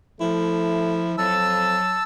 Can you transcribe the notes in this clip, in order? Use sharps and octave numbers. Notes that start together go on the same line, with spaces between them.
F3 A3 E4
F2 F#3 A5 E6